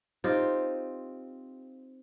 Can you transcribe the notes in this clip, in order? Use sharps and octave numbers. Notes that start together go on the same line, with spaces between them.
C4 D#4 F4 G4